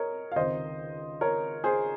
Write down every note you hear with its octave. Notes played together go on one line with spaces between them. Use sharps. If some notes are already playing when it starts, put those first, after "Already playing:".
Already playing: A#4 C#5 D#5
F5
C#2 C3 D#3 C5 D#5
A#4 C#5
G#4 C5